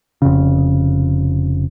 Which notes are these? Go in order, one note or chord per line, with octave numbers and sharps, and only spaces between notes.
F1 C#3